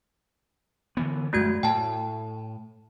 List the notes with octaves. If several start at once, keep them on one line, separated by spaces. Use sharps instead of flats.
D3 E3 B3
F#2 G#3 A3 F#4 G#6
A2 G5 A5